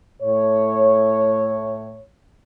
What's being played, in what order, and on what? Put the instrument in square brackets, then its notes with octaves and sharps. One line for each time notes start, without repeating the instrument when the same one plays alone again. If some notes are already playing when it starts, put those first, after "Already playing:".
[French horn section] A2 C#5